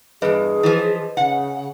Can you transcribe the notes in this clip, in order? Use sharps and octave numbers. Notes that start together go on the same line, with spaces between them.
E2 G2 G#4 B4 D#5
E3 F3
C#3 F#5